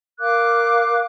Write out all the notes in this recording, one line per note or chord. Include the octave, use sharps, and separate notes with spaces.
A#4 F5 D6 F#6